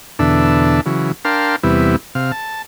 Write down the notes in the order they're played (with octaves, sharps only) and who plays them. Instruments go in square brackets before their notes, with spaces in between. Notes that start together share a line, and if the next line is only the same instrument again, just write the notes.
[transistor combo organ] E2 B2 D3 D4 A4 E5
C#3 E3 F#3
D4 A#4 F5 G5 A5 C6
E2 C3 G3 B3 E4
C3 F5
A5